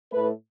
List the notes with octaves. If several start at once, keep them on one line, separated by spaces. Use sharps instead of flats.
A2 A3 B4